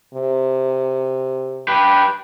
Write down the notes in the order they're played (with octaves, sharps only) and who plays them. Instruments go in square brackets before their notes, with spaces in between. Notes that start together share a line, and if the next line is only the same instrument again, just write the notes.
[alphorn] C3
[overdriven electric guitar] G4 B4